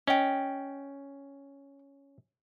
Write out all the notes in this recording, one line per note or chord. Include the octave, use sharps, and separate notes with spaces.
C#4 D#5 G5